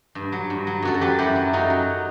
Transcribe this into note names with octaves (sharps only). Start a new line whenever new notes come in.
G2
F#3
G2
F#3
F#2 F#4 A4
A4
F#3 G4 B4
F#2 E4 G4
F#3
F#2 D#4 F#4
F#3